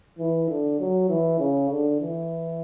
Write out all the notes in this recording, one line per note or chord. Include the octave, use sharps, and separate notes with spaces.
E3
D3
F#3
E3
C#3
D3
E3